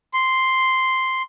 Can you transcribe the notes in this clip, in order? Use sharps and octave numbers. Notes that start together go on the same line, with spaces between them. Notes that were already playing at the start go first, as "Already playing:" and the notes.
C6